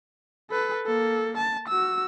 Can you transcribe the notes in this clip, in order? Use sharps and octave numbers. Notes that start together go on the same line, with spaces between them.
A4 B4
A#3 A4
A5
F#4 E6